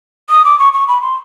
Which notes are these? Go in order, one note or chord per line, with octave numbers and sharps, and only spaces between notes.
D#6
D6
C#6
C#6
B5
C6